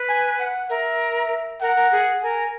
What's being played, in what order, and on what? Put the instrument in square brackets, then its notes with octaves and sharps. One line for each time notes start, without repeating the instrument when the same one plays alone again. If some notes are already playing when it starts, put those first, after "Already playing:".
Already playing: [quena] B4
[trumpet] G#5
F#5
[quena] A#4 [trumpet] E5
[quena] A#4 [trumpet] F#5
[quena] A#4
G#4
[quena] A#4 [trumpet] G#5